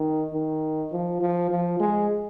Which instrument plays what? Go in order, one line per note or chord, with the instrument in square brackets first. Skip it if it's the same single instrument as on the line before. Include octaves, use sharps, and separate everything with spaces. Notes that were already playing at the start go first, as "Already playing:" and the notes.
Already playing: [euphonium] D#3
D#3
F3
F3
F3
G#3